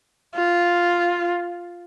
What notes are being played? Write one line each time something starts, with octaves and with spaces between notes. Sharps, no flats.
F4